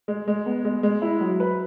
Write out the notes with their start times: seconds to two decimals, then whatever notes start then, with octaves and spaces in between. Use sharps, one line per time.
0.08 G#3
0.28 G#3
0.46 B3
0.65 G#3
0.83 G#3
1.02 E4
1.21 F#3
1.40 B4